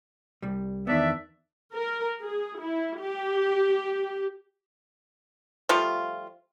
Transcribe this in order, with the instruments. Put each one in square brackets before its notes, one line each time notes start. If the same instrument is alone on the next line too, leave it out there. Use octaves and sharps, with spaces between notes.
[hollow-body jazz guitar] C2 G3
[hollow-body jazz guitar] E2 D#3 B3 [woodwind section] D4 D5 E5
[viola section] A#4
G#4
E4
G4
[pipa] F3 G3 A3 F4